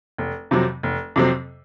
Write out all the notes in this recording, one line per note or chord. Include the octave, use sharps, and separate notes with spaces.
F1
F2 C3 F#3 C4
F1
F2 C3 F#3 C4